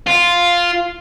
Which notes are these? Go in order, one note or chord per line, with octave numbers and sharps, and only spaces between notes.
F4